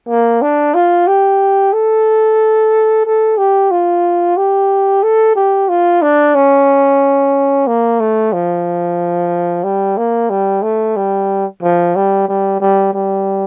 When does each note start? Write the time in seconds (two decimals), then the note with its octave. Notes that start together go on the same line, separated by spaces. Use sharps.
0.08 A#3
0.42 D4
0.74 F4
1.08 G4
1.73 A4
3.05 A4
3.38 G4
3.71 F4
4.37 G4
5.03 A4
5.36 G4
5.69 F4
6.02 D4
6.35 C#4
7.67 A#3
8.00 A3
8.33 F3
9.64 G3
9.97 A#3
10.30 G3
10.63 A3
10.97 G3
11.63 F3
11.96 G3
12.28 G3
12.61 G3
12.93 G3